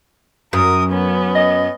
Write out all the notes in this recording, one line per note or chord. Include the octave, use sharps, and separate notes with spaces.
F#2 A#4 D#6
B3 C#4
D#5